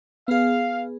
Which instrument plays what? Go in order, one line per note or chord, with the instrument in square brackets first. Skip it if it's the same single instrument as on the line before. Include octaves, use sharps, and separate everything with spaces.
[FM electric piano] B3 G#4 [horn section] F5